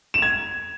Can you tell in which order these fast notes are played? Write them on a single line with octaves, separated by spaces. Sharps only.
E7 F7 G#6